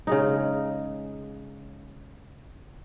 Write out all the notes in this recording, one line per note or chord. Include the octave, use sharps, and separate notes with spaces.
C#3 G#3 D#4